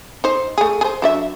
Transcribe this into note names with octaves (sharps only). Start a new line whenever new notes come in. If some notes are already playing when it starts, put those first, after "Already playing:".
D#4 C5
A3 G#4
G#4 C5
F#3 D4 E5